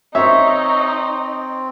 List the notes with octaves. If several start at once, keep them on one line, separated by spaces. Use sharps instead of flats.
C4 D#4 C#5 E5